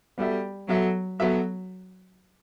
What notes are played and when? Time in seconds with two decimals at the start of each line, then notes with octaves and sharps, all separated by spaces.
0.18 G3 B3 F#4 A4 E5
0.68 F#3 B3 F#4 A4 E5
1.19 F#3 B3 F#4 A4 E5